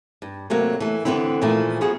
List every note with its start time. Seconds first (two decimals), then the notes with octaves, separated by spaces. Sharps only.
0.22 G2
0.50 C3 F#3 A3 A#3
0.80 E3 A3
1.05 D3 E3 F#3 B3 C4 E4
1.41 A#2 E3 F3 A3
1.81 F3 B3 F#4 G#4